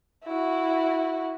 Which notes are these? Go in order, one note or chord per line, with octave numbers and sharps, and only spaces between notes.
E4 F#4